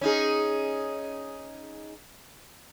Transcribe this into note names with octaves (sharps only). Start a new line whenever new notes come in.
C#4 D#4 G#4